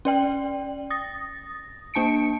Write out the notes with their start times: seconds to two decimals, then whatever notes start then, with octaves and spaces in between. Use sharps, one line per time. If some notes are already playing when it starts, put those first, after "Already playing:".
0.05 C#4 D5 G5
0.90 D#6 A6 A#6
1.94 A#3 D4 A5 C#7 D7